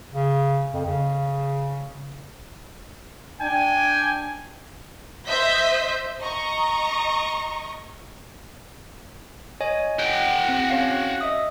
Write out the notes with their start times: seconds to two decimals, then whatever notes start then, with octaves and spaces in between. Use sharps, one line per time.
0.13 C#3
0.73 F2
0.86 C#3
3.40 D4 G5 G#5
5.27 C5 D#5 E5 E6 G6 B6
6.20 D#5 A#5 C#6
9.61 C#5 D#5 G#5
9.99 F#4 G5
10.49 C4
10.70 C#4 C#5 F5
11.21 D#5 E5 D#6